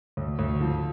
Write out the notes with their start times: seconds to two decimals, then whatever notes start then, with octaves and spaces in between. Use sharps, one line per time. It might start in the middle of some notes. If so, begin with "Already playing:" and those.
0.17 D2
0.39 D2
0.61 F3